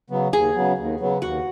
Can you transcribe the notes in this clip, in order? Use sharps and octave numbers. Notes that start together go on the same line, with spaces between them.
C#3 F#3 B3
D#2 G#4
C#3 F#3 B3
D#2
C#3 F#3 B3
D#2 F#4